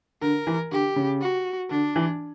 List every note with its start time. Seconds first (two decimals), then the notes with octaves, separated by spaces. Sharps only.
0.22 D3 A#4
0.47 E3
0.72 D3 G4
0.96 C#3
1.21 F#4
1.70 D3 D4
1.96 E3